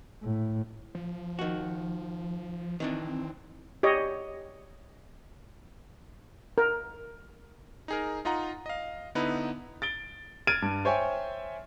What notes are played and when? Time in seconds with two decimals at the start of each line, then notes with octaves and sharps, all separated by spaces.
0.23 A2
0.95 F3
1.39 D#3 F#4
2.80 D#3 E3 C4 D4
3.83 G4 C#5 D#5
6.58 A#4
7.88 D#4 G#4 A#4
8.25 D#4 F4 D#5 F#5 A#5
8.66 D#5 F5
9.15 D3 B3 D#4 E4 B4
9.82 A6 D7 G7
10.47 F6 G#6 A6 D7 D#7
10.62 G2
10.85 C5 C#5 E5 G5 G#5